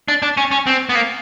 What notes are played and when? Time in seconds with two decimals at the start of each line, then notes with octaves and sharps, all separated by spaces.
0.08 D4
0.22 D4
0.37 C#4
0.51 C#4
0.67 C4
0.89 B3
0.95 A#3